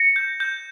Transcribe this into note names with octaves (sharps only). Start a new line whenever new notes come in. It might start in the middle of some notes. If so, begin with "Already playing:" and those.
Already playing: A#6 C#7
G6
G6